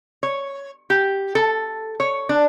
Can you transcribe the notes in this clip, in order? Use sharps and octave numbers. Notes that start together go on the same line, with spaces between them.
C#5
G4
A4
C#5
D4